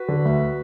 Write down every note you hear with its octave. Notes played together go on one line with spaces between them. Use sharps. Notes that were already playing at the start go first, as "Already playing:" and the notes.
Already playing: F#4 B4
D3
D2